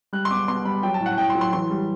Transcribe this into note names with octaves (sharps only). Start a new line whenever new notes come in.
G3 F#6
C6
B2 D6
B2 C6
G3 B5
F#3 G5
A5
A2
F#5
A2 G5
C6
F#3
C6
E3 C6
G3